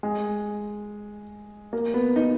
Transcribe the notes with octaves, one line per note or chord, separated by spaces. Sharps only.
G#3
A#3
B3
D#4